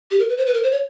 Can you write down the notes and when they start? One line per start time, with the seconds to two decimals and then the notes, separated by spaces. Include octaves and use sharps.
0.11 G4
0.19 A#4
0.29 B4
0.38 C5
0.46 B4
0.54 A#4
0.63 C5
0.72 C#5